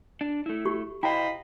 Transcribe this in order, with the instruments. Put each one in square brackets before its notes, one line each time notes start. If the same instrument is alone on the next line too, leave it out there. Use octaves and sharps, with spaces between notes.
[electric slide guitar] D4
A3 E4
[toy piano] F#4 G4 C#6
[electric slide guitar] E4 C5 [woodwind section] D#5 F5 B5 [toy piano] G5 A#5